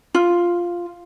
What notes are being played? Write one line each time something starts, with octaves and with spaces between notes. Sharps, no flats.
F4